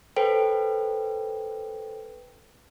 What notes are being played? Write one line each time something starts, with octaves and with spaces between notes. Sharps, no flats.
A4 B4 C5 G5